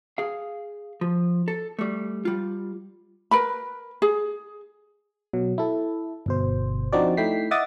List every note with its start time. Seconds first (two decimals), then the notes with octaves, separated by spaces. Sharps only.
0.18 G#4 F5
1.01 F3
1.48 A4
1.79 G3 A3
2.25 G3 F4
3.31 A#4 B4 B5
4.02 G#4
5.33 B2 F#3
5.58 E4 A4
6.26 G1 B2 C5
6.93 F3 C4 D4 D#4 F#4 D5
7.17 A3 D#4 E4 G5 B6 C7
7.51 D#5 E5 F#5 D6 D#6 A6